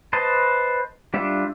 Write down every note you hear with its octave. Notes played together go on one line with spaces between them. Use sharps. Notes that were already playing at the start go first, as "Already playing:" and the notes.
B4 C5 D#5 A5
G3 D4 F4 E5